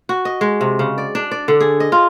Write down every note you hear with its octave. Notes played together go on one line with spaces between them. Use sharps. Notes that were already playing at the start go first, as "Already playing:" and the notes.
F#4
D#5
G#3
C3
C#3
D5
D4
D5
D3
G#4
D#5
F4